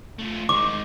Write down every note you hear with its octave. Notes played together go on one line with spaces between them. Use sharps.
A3 F4
D#3 G#3 D6